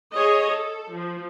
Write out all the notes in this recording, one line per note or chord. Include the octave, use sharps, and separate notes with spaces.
G#4 C#5 D#5
A4
F3